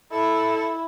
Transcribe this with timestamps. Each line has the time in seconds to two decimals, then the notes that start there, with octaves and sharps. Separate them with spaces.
0.12 E4 A4